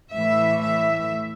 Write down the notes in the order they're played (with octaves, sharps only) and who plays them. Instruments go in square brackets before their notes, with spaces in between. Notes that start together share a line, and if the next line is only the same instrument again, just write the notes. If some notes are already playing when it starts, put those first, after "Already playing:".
[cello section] A2 E3 A3 E5
E5